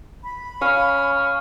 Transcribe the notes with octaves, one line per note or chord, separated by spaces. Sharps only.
B5
C#4 F5